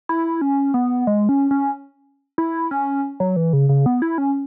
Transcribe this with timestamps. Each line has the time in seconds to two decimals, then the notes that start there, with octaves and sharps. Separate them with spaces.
0.09 E4
0.41 C#4
0.74 B3
1.07 G#3
1.29 C#4
1.51 C#4
2.38 E4
2.71 C#4
3.20 F#3
3.36 E3
3.53 C#3
3.69 C#3
3.86 B3
4.02 E4
4.18 C#4